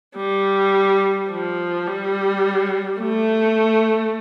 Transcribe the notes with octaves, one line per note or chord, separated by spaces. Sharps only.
G3
F3
G3
A3